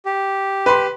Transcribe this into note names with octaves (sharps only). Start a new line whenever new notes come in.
G4
B4 C6